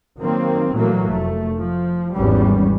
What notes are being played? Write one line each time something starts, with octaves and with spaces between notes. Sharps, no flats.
D#3 F#3 A#3 C4
A#2 E3 F#3 A3 A#3
F1 A3
F3
G#1 E2 G3 B3 C#4